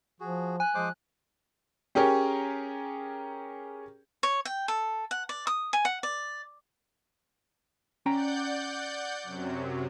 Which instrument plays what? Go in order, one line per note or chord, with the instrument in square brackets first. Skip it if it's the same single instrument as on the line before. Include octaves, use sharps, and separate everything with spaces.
[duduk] F3 [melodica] F#4 G#4
[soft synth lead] G#5 [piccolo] F#6
[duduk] F3 [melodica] G#3 C5 D6
[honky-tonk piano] C#4 G4 G#4 A#4 C#5
[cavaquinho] C#5
G5
A4
F#5
D5
D#6
G#5
F#5
D5
[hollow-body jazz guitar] C#4 G5 A#5 [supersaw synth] D5 F#5 G6
[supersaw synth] F#2 C3 F#3